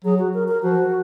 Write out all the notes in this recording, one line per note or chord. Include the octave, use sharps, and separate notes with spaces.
F#3 G#4
F#4
A#4
A#4
F3 F#4